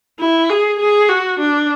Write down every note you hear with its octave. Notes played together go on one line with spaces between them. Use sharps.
E4
G#4
G#4
F#4
D4